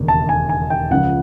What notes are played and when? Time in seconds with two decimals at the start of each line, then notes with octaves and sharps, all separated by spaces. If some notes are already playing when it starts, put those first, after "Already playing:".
Already playing: E1 D#2 C#3
0.08 A5
0.29 G#5
0.49 G#5
0.70 G5
0.90 C#2 C#3 F3 F#5